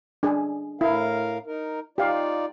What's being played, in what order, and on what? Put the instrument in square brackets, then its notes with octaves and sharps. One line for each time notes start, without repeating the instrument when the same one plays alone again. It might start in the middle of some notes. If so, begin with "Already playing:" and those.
[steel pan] D4 G#4
[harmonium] A2 A#4 F5 [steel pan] E4
[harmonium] D#4 A#4
[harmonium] D#4 F4 D5 [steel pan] G4 F5